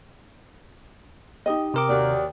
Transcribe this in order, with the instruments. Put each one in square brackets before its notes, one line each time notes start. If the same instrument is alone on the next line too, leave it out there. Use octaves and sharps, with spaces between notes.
[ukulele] D#4 G4 D#5 [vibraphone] G5 D#6
[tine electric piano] C3 A#4 D6
[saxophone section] D#2 D5 [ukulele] F#4